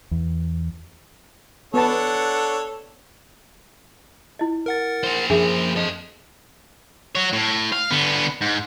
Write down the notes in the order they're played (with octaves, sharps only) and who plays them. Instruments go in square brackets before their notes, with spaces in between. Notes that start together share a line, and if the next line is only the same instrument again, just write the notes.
[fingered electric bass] E2
[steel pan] B3 A5 [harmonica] D4 C#5 F#5 [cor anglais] A4
[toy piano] E4 D#5
[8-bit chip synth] A#4 F#5 A6
[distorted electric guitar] A#3 C5
[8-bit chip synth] F#2 F3 [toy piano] D4 G#4 E5
[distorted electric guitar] A4 D#5
F#4 C#5
A2
F5
D3 B3
G#2